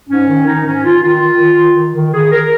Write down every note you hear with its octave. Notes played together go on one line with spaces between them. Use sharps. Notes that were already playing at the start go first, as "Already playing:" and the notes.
G#2 C#4
D#3
D#3 D#4
G#2 C#4
D#3 F4
D#3 F4
D#3
D#3
D#3
D#3
D#3
D#3 G#4
A#4